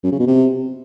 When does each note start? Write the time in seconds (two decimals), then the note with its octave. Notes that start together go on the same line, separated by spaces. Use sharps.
0.04 F#2
0.11 C#3
0.19 B2
0.27 C3